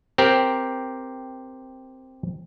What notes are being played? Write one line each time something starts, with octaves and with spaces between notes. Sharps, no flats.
C4 G4 A#4